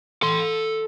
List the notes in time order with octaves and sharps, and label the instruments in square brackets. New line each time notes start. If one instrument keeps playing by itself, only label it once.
[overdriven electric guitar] A4 C6